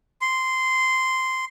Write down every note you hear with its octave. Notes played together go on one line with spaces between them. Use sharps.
C6